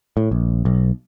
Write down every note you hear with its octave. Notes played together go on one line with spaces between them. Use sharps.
A2
A#1
B1